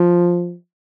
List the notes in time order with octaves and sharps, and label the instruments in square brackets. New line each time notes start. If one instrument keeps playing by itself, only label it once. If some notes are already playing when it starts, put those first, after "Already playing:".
Already playing: [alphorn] F3